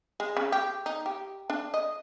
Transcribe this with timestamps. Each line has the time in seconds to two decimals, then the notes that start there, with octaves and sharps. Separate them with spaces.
0.20 G#3
0.37 C#3
0.52 G4
0.86 D#4
1.06 G4
1.50 D4
1.74 D#5